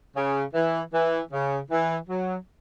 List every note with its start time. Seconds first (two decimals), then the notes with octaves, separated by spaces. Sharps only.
0.16 C#3
0.54 E3
0.93 E3
1.32 C#3
1.71 E3
2.09 F#3